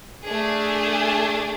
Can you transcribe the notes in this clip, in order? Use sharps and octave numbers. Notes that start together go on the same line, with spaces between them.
A3 D4 G#4